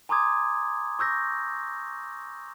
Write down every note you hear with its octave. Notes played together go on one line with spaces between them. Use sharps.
G#5 A#5 C6 D6 D#6 G#6
C#6 E6 G6 A#6